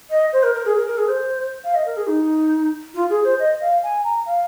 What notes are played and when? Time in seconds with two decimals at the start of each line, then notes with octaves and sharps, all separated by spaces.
0.10 D#5
0.32 C5
0.43 A#4
0.54 A#4
0.65 G#4
0.77 A#4
0.87 A#4
0.98 G#4
1.08 C5
1.64 F5
1.75 D#5
1.86 A#4
1.97 G#4
2.07 D#4
2.94 F4
3.10 G#4
3.24 C5
3.39 D#5
3.61 F5
3.83 G#5
4.04 A#5
4.26 F5